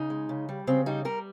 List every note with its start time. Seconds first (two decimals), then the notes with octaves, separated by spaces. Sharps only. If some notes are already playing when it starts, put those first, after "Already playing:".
Already playing: C#3 D#4
0.10 G#3
0.29 C#3
0.49 G3
0.67 C#3 C4
0.86 G3 D#4
1.05 G3 A#4